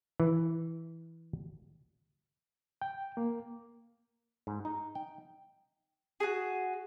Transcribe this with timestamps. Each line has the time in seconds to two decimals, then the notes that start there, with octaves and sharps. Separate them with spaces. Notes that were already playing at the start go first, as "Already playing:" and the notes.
0.20 E3
2.82 G5
3.17 A#3
4.47 G#2
4.65 D#4
4.95 G5
6.20 F#4 G#4